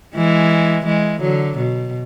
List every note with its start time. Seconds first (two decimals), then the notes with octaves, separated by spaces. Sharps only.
0.15 E3 G#3
0.86 E3 G#3
1.21 D3 F#3
1.57 B2